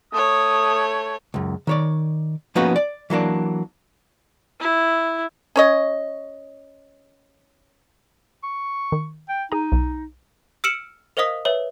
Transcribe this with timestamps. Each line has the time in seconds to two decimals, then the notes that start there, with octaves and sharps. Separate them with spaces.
0.13 A3 C#5 D#6
1.34 C#2 F#2
1.67 D#3 C#5 D5
2.55 F3 A#3 B3 C#4 D#4 F#4
2.76 D5
3.10 E3 F#3 A#3 D4
4.60 E4
5.56 C#4 C#5 D#5
8.43 C#6
8.92 D#3
9.29 G5
9.52 D#4 G#4 A#5
9.72 B1
10.64 E6 F6 C#7 D7 E7 F#7
11.17 A#4 C5 D#5 F5 D#6 B6
11.45 B4 C#5 E5